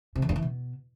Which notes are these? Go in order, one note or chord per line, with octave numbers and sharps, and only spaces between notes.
C3
E2
G2
E3
B2